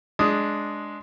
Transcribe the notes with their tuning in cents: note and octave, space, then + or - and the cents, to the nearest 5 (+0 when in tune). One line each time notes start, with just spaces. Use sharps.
G#3 +10 D4 +0 D#6 +0